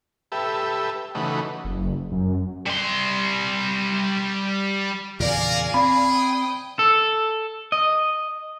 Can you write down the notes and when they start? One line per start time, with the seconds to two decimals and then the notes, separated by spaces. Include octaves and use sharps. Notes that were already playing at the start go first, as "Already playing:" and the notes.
0.32 G4 A4 B4 E5
1.15 C#3 E3 A3 D#4 F#4 B4
1.64 F#1
2.12 F#2
2.66 G3 C6
5.20 E2 A#2 C#3 A#4 D5 F5 G#5
5.74 C4 G#4 B5
6.11 G5 D#6
6.79 A4
7.72 D#5